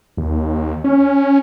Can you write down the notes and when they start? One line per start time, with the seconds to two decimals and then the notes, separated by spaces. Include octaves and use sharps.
0.17 D#2
0.84 C#4